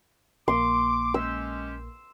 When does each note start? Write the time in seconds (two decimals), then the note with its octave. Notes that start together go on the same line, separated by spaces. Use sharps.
0.48 A#1 A#3 C6 D6
1.14 G#3 C#4 G4 E6